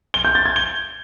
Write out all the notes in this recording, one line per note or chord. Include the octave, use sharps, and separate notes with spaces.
G7
G6
A6
G#6
G7